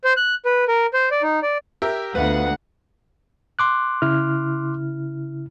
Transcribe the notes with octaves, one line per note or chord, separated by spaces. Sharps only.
C5
F#6
B4
A#4
C5
D5
D#4
D5
G4 A#4 E5
D2 B3 F4 B4 F#5
C6 D6 F#6
C#3 E4 F6